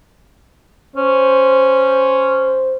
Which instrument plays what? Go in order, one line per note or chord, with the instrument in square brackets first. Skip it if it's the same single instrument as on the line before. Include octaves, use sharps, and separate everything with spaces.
[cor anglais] C#4 [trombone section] C5